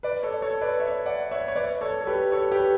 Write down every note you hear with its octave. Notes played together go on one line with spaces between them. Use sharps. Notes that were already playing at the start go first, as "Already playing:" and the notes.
B4 D5
A4 C#5
A4 C#5
B4 D5
C#5 E5
D5 F#5
C#5 E5
C#5
B4 D5
A4 C#5
A4
G4 B4
A4 C#5
G4 B4